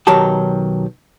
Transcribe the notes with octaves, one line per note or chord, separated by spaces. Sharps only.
B1 D#3 F#3 D#4 G4 A5